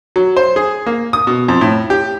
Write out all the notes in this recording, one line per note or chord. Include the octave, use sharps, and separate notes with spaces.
F#3
C5
G#4
A#3
D#6
B2
F2
A2
G4